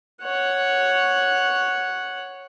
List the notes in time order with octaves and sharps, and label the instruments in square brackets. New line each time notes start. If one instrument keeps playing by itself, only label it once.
[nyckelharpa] C#5 F#5